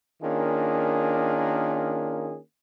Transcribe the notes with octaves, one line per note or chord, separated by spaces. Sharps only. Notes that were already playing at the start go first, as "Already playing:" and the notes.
D#3 A#3 C#4 D4 F4 G#4